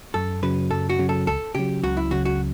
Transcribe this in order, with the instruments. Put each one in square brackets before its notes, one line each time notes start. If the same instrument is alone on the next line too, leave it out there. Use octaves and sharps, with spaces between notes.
[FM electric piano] F#2 [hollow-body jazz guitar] A4
[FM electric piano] C#3 F#3 [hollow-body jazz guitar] B4
[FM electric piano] F#2 [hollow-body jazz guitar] A4
[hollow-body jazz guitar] F#4
[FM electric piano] C#3 F#3
[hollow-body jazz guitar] A4
[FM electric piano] C#2 [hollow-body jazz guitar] A4
[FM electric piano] C#3 F#3 [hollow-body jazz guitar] G4
[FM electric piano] C#2 [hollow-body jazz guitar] F#4
[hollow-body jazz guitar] E4
[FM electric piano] C#3 F#3 [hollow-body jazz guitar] F#4
[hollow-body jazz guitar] F#4